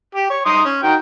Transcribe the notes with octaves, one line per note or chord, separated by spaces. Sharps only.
G4
C#5
D#4 C6 D#6
C#4
D#3 F#4 G5